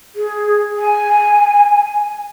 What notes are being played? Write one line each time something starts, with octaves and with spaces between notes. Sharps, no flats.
G#4
G#5